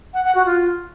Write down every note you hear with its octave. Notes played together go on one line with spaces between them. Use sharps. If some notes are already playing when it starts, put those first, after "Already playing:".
F#5
F#5
F#4
F4